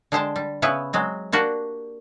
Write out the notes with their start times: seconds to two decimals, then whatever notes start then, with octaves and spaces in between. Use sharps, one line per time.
0.12 D3 G#3 G4 C5 G5 A5
0.36 G3
0.62 C#3 B3 E4 B4
0.93 F#3 G#3 C4
1.32 A#3 D4 F#4 G4